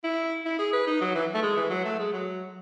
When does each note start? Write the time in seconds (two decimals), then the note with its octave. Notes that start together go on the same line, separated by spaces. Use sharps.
0.04 E4
0.45 E4
0.59 G#4
0.73 B4
0.87 D#4
1.01 F#3
1.15 E3
1.34 A3
1.42 G#3
1.56 E3
1.70 F#3
1.85 A3
1.99 G#3
2.12 F#3